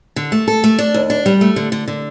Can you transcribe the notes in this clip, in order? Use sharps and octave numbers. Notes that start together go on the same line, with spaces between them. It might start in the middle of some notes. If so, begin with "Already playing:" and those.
D3
A3
A4
A3
D4
D#2
D4
G3
A3
D3
D3
D3